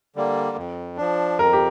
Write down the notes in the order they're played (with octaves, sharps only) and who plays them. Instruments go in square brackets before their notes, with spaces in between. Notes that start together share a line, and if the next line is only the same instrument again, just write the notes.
[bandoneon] D3 G3 A#3
F2
F3 D4
[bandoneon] F2 [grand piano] A#4
[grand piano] G4